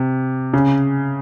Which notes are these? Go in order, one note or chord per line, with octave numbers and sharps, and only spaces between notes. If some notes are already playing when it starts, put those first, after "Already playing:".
Already playing: C3
C#3